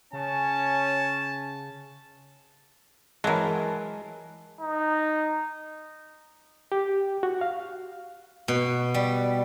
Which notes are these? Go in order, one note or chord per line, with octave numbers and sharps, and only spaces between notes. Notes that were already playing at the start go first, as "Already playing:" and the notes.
C#3 C#4 G#5 A5
E3 F#3 G#3 A#4 A5
D#4
G4
F#4
F5
B2
G3